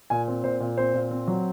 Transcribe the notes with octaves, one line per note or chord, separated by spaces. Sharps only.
A#2 G#5
C4
A#2 C5
A#2
C4 C5
A#2
C4
F#3